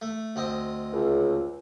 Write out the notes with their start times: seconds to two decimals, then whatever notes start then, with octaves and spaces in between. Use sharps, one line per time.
0.02 A3
0.36 D2 C4 D#5
0.93 C#2